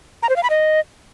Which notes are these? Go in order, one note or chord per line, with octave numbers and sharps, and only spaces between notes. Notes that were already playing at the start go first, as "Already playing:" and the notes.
A#5
C5
F5
B5
D#5